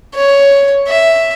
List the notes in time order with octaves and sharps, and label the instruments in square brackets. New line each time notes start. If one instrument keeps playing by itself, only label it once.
[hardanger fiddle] C#5
E5